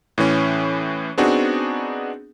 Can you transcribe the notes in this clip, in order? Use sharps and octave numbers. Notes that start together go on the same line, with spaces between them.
A2 E3 C#4
B3 C4 D4 D#4 F#4 G#4